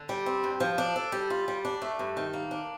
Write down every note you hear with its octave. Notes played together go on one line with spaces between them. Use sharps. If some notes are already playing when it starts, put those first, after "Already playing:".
Already playing: D3
G3
C4
G2
F3
D4
A4
G3
F4
G3
D4
A3
G2
D#3
A#3
D4